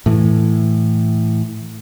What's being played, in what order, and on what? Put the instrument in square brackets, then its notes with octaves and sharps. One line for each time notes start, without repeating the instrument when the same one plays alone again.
[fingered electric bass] A2 E3